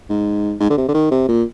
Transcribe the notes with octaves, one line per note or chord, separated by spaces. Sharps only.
G#2
G#2
D3
C3
D3
D#3
C3
A#2